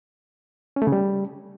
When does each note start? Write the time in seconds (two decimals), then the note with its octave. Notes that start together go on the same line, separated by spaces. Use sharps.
0.76 C#4
0.82 A3
0.87 C#3
0.92 G3